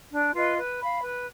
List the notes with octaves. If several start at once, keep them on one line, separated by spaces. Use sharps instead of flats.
D4
F4 B4 D#5
B4
F5 B5
B4